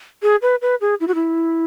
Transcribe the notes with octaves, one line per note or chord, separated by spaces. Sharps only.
G#4
B4
B4
G#4
E4
F#4
E4